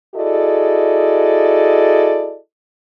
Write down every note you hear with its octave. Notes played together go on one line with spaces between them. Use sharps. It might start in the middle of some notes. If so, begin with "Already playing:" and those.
E4 F#4 G#4 A4 D5 D#5